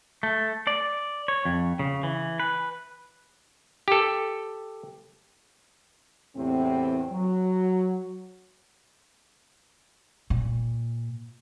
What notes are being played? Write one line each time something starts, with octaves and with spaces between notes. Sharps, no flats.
A3
D5
C#5
F2
C#3
E3
B4
G4 A4
E2 A2 C3 C4
F#3
A#2